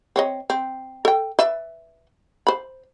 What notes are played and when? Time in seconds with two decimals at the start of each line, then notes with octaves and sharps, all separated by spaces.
0.16 C4 C#5 D#5
0.50 C4
1.05 A4 G5
1.39 B4 D5 E5
2.47 C5 B5